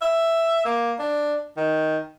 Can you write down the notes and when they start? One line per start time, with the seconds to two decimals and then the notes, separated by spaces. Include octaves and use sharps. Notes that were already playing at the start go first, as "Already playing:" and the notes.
0.02 E5
0.65 A#3
0.99 D4
1.57 D#3